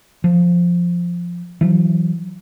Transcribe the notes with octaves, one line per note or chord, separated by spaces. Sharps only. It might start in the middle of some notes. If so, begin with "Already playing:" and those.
F3
E3 F#3